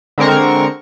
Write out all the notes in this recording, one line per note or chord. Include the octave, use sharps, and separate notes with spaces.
D3 G#3 C4 A#4 C#6